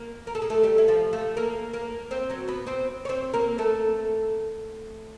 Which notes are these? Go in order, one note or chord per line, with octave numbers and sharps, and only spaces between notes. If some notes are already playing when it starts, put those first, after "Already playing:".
Already playing: A#3
A#4
A4
G#4
A3 A4
G3 G4
E4
F3 F4
A3 A4
A#3 A#4
A#3 A#4
C4 C5
F#3 F#4
B3 B4
C4 C5
C#5
C4 C5
A#3 A#4
A3 A4